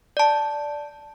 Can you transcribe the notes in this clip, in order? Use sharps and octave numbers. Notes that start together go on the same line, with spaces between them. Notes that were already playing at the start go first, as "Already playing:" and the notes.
D5 A5